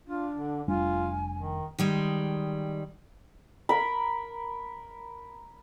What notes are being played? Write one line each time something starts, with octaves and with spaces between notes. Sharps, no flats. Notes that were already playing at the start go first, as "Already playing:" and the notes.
D4 F4
D3
F1 G3 D4 F4 G#5
D#3
D#3 G3 G#3
A#4 B5